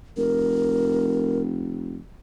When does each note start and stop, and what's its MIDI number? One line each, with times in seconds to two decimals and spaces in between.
0.17 2.00 29
0.17 1.41 70